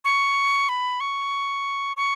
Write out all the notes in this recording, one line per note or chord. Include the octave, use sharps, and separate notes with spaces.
C#6
B5
C#6
C#6